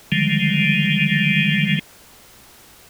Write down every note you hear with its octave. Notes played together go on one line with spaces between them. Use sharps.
D3 D#3 F3 G3 G#3